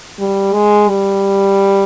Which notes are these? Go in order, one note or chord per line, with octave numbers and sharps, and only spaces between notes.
G3
G#3
G3